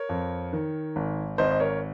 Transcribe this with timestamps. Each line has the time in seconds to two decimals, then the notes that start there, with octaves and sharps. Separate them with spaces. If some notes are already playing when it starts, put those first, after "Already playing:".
Already playing: A#4 C#5
0.09 F2
0.53 D#3
0.96 G#1
1.38 G#1 C5 D#5
1.51 D#5
1.60 A#4 C#5